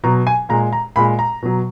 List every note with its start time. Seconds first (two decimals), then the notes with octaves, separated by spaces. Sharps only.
0.04 B2 F#3 A#5
0.27 G#5
0.49 A#2 G#3 A#5
0.73 A#5
0.96 A#2 G#3 B5
1.19 A#5
1.42 B2 F#3